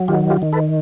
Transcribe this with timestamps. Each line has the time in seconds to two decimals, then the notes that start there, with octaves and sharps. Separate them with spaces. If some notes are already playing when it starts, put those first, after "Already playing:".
Already playing: F#3
0.08 D#3 F4 G4
0.30 F4 G4
0.42 D#3
0.53 A4 B4